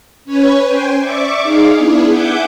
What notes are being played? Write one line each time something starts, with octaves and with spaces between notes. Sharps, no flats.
C#4 B4 C#5 G#5
C5 G5 G#5
D5 E5 C#6 D6
D#4 G#4 F5 D6
B3 D4 E4 G#4
E5 F#5 G#5 D6 G6